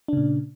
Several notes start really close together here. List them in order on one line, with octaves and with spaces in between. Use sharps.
D4 C#3 A#2